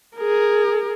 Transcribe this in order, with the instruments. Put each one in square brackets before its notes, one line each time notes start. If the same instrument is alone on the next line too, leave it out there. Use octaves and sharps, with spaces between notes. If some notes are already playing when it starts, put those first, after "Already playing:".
[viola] G#4 A#4